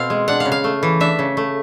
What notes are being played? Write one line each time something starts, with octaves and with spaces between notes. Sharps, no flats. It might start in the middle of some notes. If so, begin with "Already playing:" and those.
Already playing: B2 C4 F5
G#3
D4 F#5
F5
C#3
F5
A3
E3
D4 E5
C#3
A3